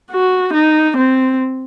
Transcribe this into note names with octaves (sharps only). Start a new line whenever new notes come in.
F#4
D#4
C4